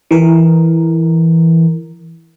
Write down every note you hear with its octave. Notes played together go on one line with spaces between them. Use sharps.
E3 A#4